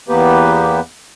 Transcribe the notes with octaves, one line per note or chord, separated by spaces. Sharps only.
E2 A#3 B3 G4 B4